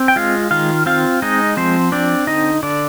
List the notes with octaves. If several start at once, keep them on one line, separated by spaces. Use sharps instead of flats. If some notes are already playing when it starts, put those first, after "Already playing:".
Already playing: C4
G5
G#3 F4 F5
D#3 F4 F5
C4 F4 F5
G#3 D#4 D#5
F3 C4 C5
C4 D4 D5
D3 D#4 D#5
D3 D4 D5